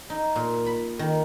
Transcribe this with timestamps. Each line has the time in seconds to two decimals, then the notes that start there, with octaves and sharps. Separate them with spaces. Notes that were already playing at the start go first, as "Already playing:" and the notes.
0.10 D#4
0.36 A#2
0.66 B5
0.99 D#3